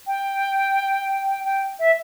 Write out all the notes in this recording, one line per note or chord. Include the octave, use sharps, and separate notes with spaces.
G5
G5
E5